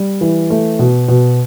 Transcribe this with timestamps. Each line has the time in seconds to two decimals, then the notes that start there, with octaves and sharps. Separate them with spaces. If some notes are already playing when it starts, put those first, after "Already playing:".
Already playing: G3
0.21 E3
0.50 A3
0.79 B2
1.08 B2